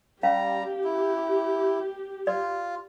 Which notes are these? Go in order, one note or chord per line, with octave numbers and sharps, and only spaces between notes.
G3 C#4 G4 F5 A#5
E4
F4 D5